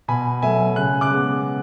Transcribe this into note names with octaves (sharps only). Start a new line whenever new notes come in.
B2 G#5 B5
F#3 A3 E5 G#5
C#3 F#6
D6 F#6
G#3 B3